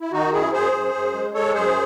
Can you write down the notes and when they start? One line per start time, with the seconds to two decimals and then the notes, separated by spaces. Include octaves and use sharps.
0.01 E4
0.12 D#3 D#4 F#4
0.32 F#2 E4 G#4
0.53 F#2 G#4 C5
0.73 F#2
0.94 F#2
1.13 G#3
1.34 G#3 A4 C#5
1.54 F#2 G#4 C5